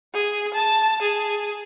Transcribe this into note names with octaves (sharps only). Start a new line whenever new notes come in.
G#4
A5
G#4